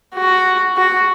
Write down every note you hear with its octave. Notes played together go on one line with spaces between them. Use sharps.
F#4
F#4